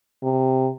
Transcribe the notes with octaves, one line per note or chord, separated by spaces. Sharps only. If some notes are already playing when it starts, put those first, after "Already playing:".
C3